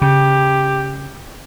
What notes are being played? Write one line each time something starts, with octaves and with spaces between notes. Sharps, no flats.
C#3 G4